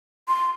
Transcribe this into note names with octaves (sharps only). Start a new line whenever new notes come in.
C6